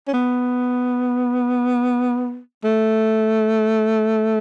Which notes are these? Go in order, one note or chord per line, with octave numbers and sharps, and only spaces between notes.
C#4
B3
A3